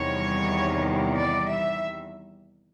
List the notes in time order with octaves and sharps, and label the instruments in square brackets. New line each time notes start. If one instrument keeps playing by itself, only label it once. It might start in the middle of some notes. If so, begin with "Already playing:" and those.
Already playing: [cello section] E2 C3 D#3 G3 C#5
D5
E5